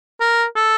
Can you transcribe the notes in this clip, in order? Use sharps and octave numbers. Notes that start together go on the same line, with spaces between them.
A#4
A4